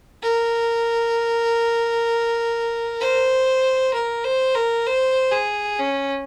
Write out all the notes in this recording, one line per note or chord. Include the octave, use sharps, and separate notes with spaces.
A#4
C5
A#4
C5
A#4
C5
G#4
C#4